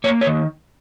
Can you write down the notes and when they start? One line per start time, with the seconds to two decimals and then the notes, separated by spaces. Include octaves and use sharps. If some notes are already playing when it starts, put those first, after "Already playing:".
0.04 A#3 C#5
0.21 C#5
0.27 D#3